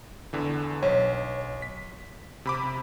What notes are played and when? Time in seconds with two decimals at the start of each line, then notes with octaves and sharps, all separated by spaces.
0.33 E2 D3 E3
0.82 B1 C#5
1.62 B6
2.45 C3 B5 D6